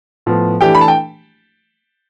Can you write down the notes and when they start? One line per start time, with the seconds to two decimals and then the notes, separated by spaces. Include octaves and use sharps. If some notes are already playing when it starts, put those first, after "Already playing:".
0.26 A2 F3 B3
0.61 E3 A3 D4 G4 G5
0.75 B5
0.81 A5
0.88 G5